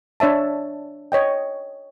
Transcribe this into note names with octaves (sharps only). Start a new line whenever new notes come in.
D4 C#5 E5 A5
C#5 D#5 G5